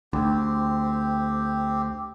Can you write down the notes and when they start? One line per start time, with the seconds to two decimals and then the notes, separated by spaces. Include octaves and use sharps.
0.13 D2 C4 G4